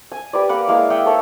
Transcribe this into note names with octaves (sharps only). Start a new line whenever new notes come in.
G#5
G4 B4 D5
A#3 B4 F#5
G#3 A#3 E4 F5
E5 F#5 G5 D#6
A4 C#5 E5